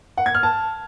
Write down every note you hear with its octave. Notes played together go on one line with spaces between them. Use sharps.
F#5
G#6
F6
A5